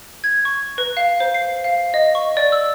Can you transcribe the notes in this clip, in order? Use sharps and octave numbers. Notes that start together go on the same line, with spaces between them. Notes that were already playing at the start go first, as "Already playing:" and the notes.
G#6
C#6
B4
F5
C5
C7
F5
D#5
C#6
D5
E6